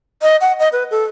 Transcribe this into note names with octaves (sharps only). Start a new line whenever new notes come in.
D#5
F#5
D#5
B4
A4